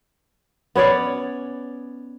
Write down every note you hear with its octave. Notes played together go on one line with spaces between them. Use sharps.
B3 C#4 C#5 D5